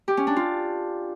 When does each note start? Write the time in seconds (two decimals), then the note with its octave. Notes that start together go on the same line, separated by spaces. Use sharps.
0.08 G4
0.17 C#4
0.27 D4
0.36 F4